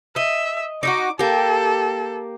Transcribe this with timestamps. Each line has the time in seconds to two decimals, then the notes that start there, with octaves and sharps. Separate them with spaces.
0.16 D#5 E5
0.83 D#4 E4 F#4 D6
1.19 A#3 G4 A4